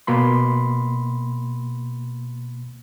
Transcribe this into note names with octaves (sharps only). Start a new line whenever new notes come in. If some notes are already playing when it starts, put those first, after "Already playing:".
B2 A#3 B5 C6